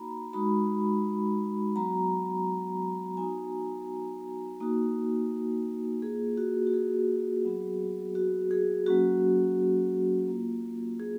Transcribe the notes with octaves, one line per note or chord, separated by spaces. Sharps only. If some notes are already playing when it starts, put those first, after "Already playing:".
Already playing: A#3 D#4 F#4 A#5 B5
G#3 D#4 F#4 B5
F#3 B3 F#4 A#5
B3 D#4 F#4 G#5
A#3 D#4 F#4
A#3 F4 G#4
F#4
F#4
G#4
F#3 B3 F#4
F#4
G#4
F#3 A#3 C#4 F#4
A#3 F4
G#4